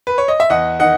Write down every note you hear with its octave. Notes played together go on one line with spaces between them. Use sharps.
B4
C#5
D#5
E5
E2 D#5 F#5
D#3 D#5 F#5